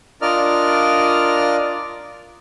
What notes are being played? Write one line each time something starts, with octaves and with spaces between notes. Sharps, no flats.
D4 F4 A#4 D5 D#5 F6